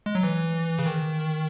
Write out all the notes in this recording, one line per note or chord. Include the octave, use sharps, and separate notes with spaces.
G#3
F#3
E3
C#3
D#3